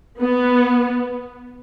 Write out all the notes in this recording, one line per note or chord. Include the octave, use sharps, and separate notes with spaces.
B3